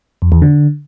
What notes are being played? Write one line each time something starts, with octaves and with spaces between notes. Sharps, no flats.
F2
E2
D3